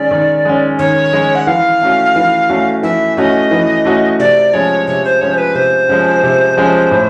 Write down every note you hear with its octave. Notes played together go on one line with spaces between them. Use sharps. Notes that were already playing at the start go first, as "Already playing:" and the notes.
Already playing: D#3 G#3 C#4 D5
D#3
G#3 C#4
D#3 C#5
G#3 C#4
F#5
E3 F5
A3 C#4 F#4
E3
A3 C#4 F#4
E3 E5
A3 C#4 F#4 D#5
E3
A3 C#4 F#4
C3 D5
F3 G#3 C#4 C#5
C3 C#5
C5
F3 G#3 C#4 C#5
C5
B4
C3 C5
F3 G#3 C#4
C3
F3 G#3 C#4
A2